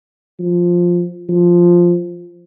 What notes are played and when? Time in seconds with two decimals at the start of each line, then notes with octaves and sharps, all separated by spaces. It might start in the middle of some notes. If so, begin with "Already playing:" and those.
0.40 F3
1.29 F3